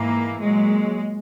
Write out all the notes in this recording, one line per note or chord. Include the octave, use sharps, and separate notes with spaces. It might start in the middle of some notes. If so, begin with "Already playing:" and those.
Already playing: G#2 E3 A#3
A#2 F#3 G#3